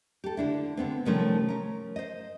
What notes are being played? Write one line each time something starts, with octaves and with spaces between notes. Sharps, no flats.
G4 A4
D3 D4 E4
D3 B3 C4
C3 D#3 F3 G3 A3 C#4
C#4 A#4
C5 D#5